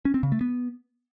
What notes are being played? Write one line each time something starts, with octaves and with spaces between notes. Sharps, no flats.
C#4
C4
C#3
A3
B3